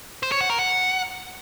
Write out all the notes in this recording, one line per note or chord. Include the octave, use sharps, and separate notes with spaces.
C5
C#5
F#5
A#4
F#5